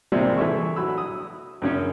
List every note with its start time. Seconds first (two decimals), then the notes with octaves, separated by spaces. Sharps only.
0.12 C3 F3 G3 G#3 A#3
0.37 E3 A4 E5 C#6
0.76 F#3 B5 E6
0.98 D#6
1.62 F#2 C#3 C#4